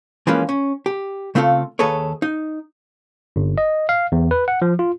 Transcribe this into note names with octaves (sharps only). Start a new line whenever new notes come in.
E3 F3 G#3 A#3 C#4 B4
C#4
G4
C#3 A3 C4 F4 G4 A4
D#2 G#4 A4 B4 C#5
D#4
G1
D#5
F5
E2
B4
F#5
F3
F4